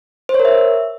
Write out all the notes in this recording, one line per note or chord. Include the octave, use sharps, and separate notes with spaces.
C5
C#5
A#4
E5